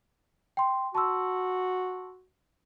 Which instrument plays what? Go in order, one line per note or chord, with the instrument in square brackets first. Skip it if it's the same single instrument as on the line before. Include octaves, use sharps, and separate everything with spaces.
[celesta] G5 C6
[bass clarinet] F#4 [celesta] A5 C6 E6